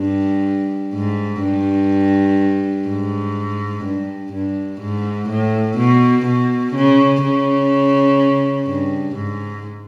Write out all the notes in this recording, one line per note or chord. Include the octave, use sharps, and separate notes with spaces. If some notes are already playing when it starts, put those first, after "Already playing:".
Already playing: G2
G#2
G2
G#2
G2
G2
G#2
A2
B2
B2
C#3
C#3
G2
G#2